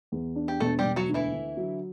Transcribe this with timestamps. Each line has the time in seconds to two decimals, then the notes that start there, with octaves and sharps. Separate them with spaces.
0.12 E2
0.36 D4
0.48 G4
0.60 E1 A3 A4
0.79 G3 G4
0.85 E1
0.96 F#3 F#4
1.09 D2
1.14 E3 E4
1.33 D3
1.57 F#3